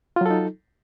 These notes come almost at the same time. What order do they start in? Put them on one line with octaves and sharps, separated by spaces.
F4 F#3 A4 D#4